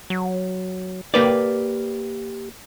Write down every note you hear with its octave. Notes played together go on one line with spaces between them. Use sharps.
F#3
A#3 G4 B4 D5